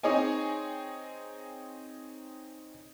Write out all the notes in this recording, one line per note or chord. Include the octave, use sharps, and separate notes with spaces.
C4 D#4 G#4 C#5 D#5 G#5